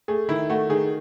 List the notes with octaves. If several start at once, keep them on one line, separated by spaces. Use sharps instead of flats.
A3 G#4
D#3 E4
A3 F#4
D#3 G#4